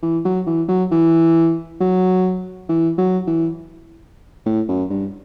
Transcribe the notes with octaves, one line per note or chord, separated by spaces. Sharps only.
E3
F#3
E3
F#3
E3
F#3
E3
F#3
E3
A2
F#2
G2